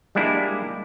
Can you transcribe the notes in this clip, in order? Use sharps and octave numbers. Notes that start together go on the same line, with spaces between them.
G3 G#3 A#3 D4 E4